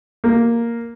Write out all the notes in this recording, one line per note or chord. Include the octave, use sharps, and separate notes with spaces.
A#3